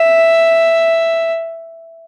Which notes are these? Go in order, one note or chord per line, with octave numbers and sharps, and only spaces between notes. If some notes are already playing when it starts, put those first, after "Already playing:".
Already playing: E5